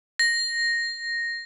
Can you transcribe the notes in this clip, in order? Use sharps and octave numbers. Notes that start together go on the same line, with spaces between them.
A#6